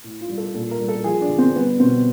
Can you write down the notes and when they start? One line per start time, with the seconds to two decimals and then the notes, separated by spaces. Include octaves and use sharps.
0.04 A2
0.21 F4
0.29 G3
0.37 A4
0.54 A#2 A4
0.71 A#4
0.80 G3
0.88 A4
1.04 F3 G#4
1.21 D4
1.30 D3
1.38 C4
1.56 G3 B3
1.80 B2 C4